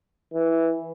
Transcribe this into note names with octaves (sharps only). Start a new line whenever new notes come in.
E3